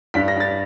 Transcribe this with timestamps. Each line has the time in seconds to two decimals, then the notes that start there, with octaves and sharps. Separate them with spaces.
0.14 G2 B6
0.28 A#6
0.36 G2 A6